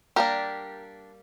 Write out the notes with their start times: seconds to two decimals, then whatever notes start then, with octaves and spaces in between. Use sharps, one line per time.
0.16 G3 A#3 D4 G4 A#4